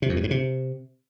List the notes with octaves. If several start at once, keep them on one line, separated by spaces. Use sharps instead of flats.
C3
F2
G2
G#2
C3